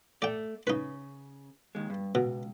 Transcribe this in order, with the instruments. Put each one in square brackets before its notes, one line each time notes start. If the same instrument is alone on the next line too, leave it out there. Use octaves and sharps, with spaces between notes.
[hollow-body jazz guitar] A3 [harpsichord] D5 G5
[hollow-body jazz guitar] C#3 [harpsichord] D#4 B4
[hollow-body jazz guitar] D#2 G#3
G2
[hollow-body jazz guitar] C#2 [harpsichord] B2